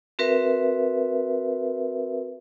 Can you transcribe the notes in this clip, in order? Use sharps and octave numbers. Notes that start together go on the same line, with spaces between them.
C4 F#4 A#4 B4 E5